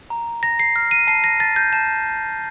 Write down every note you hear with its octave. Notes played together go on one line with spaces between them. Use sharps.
A#5
A#5 A#6
C7
F6
D#7
A5 C7
A#6
A5 A6
G6
A5